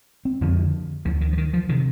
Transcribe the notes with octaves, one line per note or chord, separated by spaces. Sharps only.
C4
F2 D3 F3
D2 D3 F3
D#3
F3
D#3
F3
C3 D#3